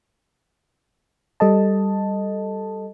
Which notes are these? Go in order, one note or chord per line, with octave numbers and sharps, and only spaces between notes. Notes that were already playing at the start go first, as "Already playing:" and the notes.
G3 A4 D#5 A5